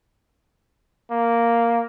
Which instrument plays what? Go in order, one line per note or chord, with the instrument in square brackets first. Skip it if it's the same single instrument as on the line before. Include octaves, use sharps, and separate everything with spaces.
[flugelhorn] A#3